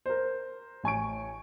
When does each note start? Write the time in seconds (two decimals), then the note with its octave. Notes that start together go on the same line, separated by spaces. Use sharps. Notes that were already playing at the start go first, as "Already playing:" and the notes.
0.06 A#4 C5
0.84 A1 G#5 C#6 D7